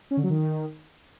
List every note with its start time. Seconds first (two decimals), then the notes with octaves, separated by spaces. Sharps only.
0.11 C#4
0.17 D3
0.23 F#3
0.30 D#3